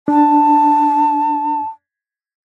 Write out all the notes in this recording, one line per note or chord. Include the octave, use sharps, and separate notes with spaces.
D4 A5